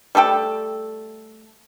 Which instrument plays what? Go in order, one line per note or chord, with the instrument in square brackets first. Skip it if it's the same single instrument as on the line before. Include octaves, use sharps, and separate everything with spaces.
[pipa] G3 A3 A4 G5